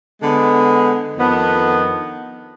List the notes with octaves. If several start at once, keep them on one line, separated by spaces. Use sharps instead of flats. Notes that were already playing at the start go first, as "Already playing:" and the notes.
D3 G#3 B3
F2 D#3 B3 D4